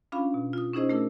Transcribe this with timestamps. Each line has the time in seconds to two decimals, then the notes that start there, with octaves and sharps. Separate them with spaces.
0.12 C#4 D4 F4 F5 B5
0.34 B2
0.53 F4 D#6
0.74 C#4 D#4 E4 G#4 C5 D#5
0.89 A3 D4 E4 A#4